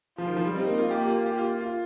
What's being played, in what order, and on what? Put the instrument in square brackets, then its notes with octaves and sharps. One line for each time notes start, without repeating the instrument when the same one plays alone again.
[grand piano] F3 [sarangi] F4
[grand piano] D#3
F3
G3
[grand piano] C4 [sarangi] D#4
[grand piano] A#3
F4
[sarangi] A#3 [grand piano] G4
[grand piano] F4
[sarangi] A#3 [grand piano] G4
[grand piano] F4
F4